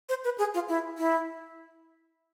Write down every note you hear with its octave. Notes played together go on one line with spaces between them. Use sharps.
C5
B4
G#4
F4
E4
E4